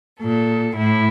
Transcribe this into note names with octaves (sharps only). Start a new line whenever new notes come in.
A#2 A4
A2 E4